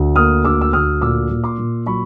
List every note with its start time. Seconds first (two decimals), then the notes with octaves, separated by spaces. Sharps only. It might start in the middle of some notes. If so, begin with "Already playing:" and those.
Already playing: D2
0.16 A#3 D#6 F6
0.45 D2 D6 E6
0.61 E6
0.73 D2 D#6 F6
1.01 A#2 D6 E6
1.30 A#2
1.44 C6 D6
1.58 A#2
1.87 F#3 B5 C#6